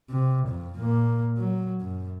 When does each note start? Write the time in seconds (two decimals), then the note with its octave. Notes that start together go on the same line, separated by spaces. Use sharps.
0.10 C3
0.48 F2
0.79 A#2 A#3
1.38 F#3
1.81 F#2